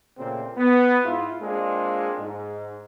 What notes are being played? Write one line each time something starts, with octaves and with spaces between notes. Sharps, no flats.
A#2 C#3 A3 C4
B3
G#2 E4 F4
G#3 A#3 C4 D4 F4
G#2